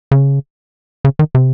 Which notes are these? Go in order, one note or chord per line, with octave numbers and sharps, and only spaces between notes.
C#3
C#3
D#3
C3